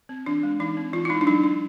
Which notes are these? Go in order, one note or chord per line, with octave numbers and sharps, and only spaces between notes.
C4
E3 D4
G#3
E3 D#4
C4
E3 F4
E4
G#3 D#4
D4
F#3 D#4
D4